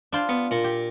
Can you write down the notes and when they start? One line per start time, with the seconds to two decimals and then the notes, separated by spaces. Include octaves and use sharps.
0.12 D4 F4 C5
0.29 B3
0.51 A#2
0.64 G4